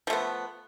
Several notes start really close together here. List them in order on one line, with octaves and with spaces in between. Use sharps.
F3 A3 B3